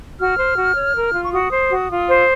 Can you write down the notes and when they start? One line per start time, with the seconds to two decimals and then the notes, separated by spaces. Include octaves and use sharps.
0.19 F#4 F6
0.38 C5
0.57 F#4
0.76 C#5
0.95 A#4
1.14 F4
1.24 C#6
1.32 F#4 D#6
1.52 C5
1.71 F#4
1.90 F4
2.08 C5